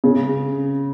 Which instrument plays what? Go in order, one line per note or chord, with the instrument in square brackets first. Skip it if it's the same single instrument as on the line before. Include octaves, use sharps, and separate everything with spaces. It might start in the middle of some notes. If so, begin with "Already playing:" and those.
[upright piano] C#3